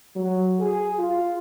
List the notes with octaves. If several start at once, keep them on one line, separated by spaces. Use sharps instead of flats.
F#3
G#4
F4